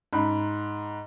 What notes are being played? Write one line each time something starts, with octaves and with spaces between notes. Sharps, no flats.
G#2 B5